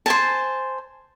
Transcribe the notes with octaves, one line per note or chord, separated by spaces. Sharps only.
C5 G#5 A5